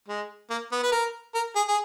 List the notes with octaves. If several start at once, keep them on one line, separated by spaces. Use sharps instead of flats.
G#3
A#3
B3
B4
A#4
A#4
G#4
G#4